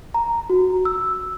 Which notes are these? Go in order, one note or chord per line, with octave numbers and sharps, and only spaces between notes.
A#5
F#4
E6